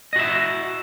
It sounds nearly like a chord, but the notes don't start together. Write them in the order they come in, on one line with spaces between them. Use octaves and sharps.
D#5 F#4 E5